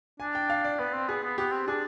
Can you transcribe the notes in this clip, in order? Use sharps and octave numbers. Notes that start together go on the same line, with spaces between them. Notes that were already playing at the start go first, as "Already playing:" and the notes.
D4 G#5
G5
F5
D5
B3 B4
C4
B3 G#4
B3
B3 G4
C4
D4 G#4